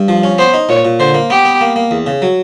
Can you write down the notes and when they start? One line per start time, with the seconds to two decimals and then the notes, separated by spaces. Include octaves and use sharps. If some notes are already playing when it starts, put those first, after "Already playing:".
Already playing: G2
0.08 F3
0.24 C#4
0.38 B3 C5
0.54 D#4
0.69 A#2 C#5
0.85 A#2
0.99 D3 C5
1.14 A#3
1.30 B3 G4
1.45 B3
1.61 A#3
1.76 A#3
1.91 E2
2.06 C#3
2.22 F#3